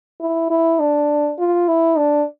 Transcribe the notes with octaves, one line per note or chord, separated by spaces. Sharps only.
E4
E4
D4
F4
E4
D4